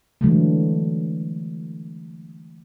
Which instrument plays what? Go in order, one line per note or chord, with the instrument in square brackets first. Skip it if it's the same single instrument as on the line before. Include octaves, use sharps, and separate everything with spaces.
[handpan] D3 E3 F#3 G#3 A3